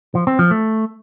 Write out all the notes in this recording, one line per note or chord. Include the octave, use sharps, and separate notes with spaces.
F3
C4
F3
A3